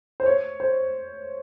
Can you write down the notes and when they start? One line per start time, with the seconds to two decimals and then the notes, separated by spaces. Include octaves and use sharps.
0.20 C5
0.26 C#5
0.60 C5